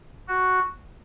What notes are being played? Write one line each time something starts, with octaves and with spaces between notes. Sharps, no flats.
F#4